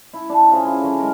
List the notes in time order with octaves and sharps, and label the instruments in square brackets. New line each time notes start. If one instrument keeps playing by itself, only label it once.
[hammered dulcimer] E4
D4 A5
C#3 F4 G#4 C5
E4 C5
D3 F#3 C#4
G#3 F4 A#4